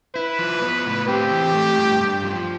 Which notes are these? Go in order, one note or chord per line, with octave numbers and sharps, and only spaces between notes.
E4 B4
F3
B3
A2
C4 G4
E3
A3
G2
G2
F3